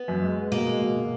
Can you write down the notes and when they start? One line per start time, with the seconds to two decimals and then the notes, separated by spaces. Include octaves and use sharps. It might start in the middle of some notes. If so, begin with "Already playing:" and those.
Already playing: B3
0.08 F#2
0.23 G#3
0.37 G#3
0.52 B2 A#3
0.67 G#3
0.81 B2
0.96 B2